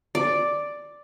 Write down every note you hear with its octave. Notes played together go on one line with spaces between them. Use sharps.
D5